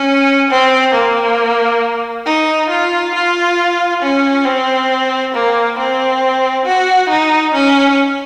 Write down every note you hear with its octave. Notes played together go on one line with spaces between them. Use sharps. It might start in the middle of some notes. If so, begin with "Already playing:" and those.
Already playing: C#4
C4
A#3
D#4
F4
F4
C#4
C4
A#3
C4
F#4
D#4
C#4